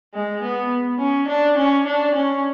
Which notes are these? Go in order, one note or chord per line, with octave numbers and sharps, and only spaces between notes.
G#3
B3
C#4
D4
C#4
D4
C#4